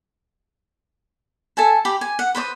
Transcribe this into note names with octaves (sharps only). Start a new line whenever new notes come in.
A4 E5 G#5 A5
G4 B5
G#5
F#5
B4 C5 D5 D#6